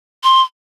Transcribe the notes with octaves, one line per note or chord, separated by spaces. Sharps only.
C6